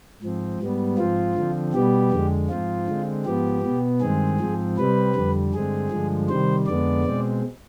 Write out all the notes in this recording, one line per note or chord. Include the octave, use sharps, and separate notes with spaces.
G#2 F3 C4
G#2 G3 B3
G#2 F3 C4 F4
D3 F3 C4
B2 G3 B3 G4
F2 D3 G#3
G#2 F3 C4 F4
D3 G#3 C4
G#2 F3 B3 G4
B2 B3
G2 D#3 G#3 C4 G#4
G#2 F3 C4
C3 G3 C4 B4
F2 D3 G3
G2 D3 G#3 C4 G#4
G2 D3 F3 G#3
C3 D#3 G3 C5
F2 D3 G#3 B3 D5
B2 G#3 C4